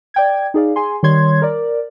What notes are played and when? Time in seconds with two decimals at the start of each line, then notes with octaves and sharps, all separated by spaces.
0.14 D5 G5 G#6
0.54 D#4 G#4 D5 F5
0.76 G#4 G#5 C6
1.03 D#3 G3 C#5 C6 G#6
1.42 A#4 D5